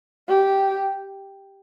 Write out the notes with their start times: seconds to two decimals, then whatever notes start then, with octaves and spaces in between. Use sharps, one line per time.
0.28 G4